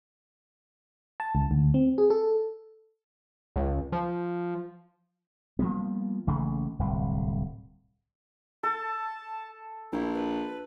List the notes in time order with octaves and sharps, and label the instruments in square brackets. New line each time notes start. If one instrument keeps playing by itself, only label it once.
[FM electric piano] A5
C#2
D2
C4
G#4
A4
[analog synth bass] C#2
F3
[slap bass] F3 G3 A#3 B3
A#1 C#3 E3 A3
D1 C2
[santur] A4 [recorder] A5
[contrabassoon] A#1 [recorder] E4
[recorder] B4